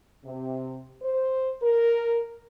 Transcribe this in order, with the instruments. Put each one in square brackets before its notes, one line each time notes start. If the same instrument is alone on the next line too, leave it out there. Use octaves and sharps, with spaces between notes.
[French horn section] C3
C5
A#4